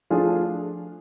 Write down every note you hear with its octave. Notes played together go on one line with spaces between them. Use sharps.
F3 A3 D4 F4 G#4